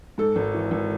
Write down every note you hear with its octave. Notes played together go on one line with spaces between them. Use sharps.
G#2 A4
G#1
E3
G#1